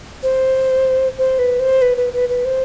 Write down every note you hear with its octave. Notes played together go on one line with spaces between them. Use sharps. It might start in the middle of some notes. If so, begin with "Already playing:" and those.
C5
C5
B4
C5
B4
B4
B4
B4
C5